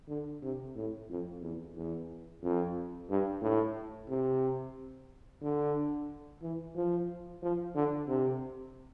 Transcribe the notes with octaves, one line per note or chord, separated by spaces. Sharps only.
D3
C3
A2
F2
E2
E2
F2
G2
A2
C3
D3
E3
F3
F3
D3
C3